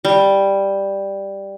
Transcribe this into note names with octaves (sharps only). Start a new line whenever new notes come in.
G3